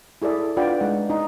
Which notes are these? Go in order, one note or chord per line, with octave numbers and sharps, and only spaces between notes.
E4 G#4 A4 D5 E5
D4 F4 B4 D5 F#5 G5
G#3 D#4 F#5
D#4